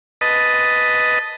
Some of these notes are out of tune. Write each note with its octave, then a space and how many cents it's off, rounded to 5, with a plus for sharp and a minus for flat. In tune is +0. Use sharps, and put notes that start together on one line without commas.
B4 +0 D#5 +5 A5 +0